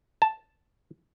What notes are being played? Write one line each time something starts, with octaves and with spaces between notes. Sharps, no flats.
A5